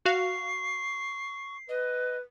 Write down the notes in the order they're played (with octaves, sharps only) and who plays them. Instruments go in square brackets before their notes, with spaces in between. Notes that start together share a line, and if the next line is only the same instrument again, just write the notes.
[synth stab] F#4 F5 [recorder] C#6 [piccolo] C7
[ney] B4 [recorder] D#5